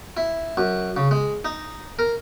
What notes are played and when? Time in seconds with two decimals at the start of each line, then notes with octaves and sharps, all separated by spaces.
0.17 E4
0.57 F#2
0.97 C#3
1.11 G#3
1.45 D#4
1.99 A#4